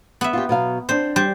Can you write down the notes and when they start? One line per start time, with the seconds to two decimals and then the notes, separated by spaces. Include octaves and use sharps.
0.21 B3 E5
0.33 F4 G4
0.49 B2 F#3 F5
0.89 C4 D4 C5
1.16 G3 C5